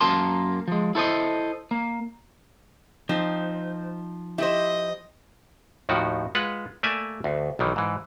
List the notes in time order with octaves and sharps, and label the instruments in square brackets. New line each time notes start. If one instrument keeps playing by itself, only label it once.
[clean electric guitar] F#2 A#3 A#4 A5 C6
F3 G#3
E4 A4 C5 D5 D#5
A#3
[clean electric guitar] F3 [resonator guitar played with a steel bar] C4 [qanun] D#4
[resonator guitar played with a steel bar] E4 C5 [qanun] G4 C#6 [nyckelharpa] D#5
[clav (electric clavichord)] D#2 A2 D#3 F3 F#4
G#3 F4 B4 F#5
A3 A#3 D5 E5 G#5
D2
B1 D#3 E3
G#2 E3